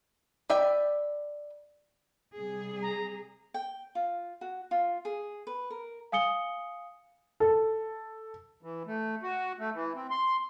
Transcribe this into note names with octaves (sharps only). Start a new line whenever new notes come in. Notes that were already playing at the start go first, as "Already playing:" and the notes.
B4 D5 E5 G5
C3 G3 G#4
A#5
G5
F4
F#4
F4
G#4
B4
A#4
F5 G#5 D#6 C#7 G7
A4
E3
A3
F#4
A3
E3
C4
C6